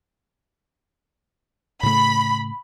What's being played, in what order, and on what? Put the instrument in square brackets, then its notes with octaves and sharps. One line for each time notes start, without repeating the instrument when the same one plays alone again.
[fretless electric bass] A2 C#3 A3 [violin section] B5